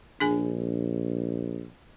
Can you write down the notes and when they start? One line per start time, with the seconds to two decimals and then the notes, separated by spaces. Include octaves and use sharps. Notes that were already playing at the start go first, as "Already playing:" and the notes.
0.20 A#1 D4 G#4 G#5